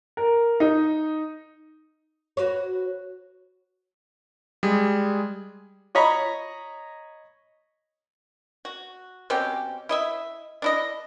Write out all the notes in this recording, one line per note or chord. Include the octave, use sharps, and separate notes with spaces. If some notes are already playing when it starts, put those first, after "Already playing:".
A#4
D#4
F#4 B4 C#5
G3 G#3 G#4
C#5 D#5 A#5 B5 C#6
F#4
B2 C4 C#4 G4
E4 D#5 E5
D4 E4 D#5